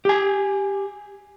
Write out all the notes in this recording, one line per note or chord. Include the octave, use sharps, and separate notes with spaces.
G4 G#5